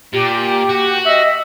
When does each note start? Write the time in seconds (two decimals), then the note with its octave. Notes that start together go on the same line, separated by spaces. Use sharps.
0.13 A#2 G4
0.69 F#4
1.06 D#5 E5